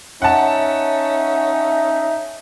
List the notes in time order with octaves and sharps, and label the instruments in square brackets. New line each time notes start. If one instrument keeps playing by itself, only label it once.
[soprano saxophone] C#4 [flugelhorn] D#4 [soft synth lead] E5 [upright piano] F#5 A5